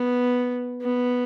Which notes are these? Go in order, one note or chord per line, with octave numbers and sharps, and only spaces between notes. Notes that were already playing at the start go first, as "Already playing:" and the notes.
Already playing: B3
B3